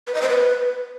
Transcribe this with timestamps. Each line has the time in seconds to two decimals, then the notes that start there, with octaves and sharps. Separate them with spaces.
0.07 B4
0.15 D#5
0.22 C5
0.29 B4